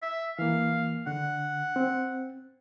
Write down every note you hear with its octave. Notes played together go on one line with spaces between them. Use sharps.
E5
E3 A#3 F5
D3 F#5
C4